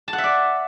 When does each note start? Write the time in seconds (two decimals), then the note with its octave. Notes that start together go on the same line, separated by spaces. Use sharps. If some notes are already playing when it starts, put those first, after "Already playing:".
0.08 A5
0.13 F#5
0.18 E5
0.24 D5